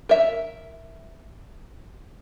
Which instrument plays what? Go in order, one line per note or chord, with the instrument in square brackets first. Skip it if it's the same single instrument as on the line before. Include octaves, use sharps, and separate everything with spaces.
[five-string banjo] A#4 E5